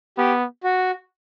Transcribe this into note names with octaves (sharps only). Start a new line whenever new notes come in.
B3 G4
F#4